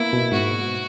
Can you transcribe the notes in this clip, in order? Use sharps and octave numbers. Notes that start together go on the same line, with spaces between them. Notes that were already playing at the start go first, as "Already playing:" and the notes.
Already playing: A#3 B3 E4
B2
G#2 F#4